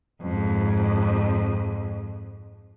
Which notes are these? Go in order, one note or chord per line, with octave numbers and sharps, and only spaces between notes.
F2 G#2